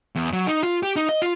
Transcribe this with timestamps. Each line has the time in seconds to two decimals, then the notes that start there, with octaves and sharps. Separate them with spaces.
0.15 E2
0.33 F#3
0.47 D#4
0.63 F4
0.83 G4
0.96 D#4
1.09 D#5
1.22 F4